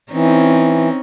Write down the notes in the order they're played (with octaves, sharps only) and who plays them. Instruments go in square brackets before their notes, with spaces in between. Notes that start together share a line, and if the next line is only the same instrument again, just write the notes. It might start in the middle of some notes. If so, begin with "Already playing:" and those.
[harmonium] E3 [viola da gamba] C4 C#4 D#4